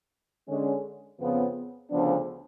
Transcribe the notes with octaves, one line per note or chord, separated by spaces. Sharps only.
D3 G#3 C#4
F2 C#3 F3 B3
D2 C#3 F3 B3 D4